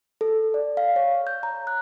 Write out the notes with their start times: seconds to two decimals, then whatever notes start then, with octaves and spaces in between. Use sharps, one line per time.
0.21 A4
0.54 D5
0.77 F5
0.96 C#5
1.27 G6
1.43 A#5
1.67 F#6